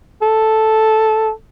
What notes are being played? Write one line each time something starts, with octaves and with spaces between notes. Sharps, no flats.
A4